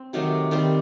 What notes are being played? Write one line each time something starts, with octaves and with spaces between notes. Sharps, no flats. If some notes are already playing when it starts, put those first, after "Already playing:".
Already playing: C4
C3 D#3 F#3 A3
D#3 G3 C4